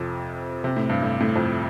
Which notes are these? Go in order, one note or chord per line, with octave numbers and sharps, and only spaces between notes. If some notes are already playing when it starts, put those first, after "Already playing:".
Already playing: F2 C3
C3
A2
G2
A2
A2
F2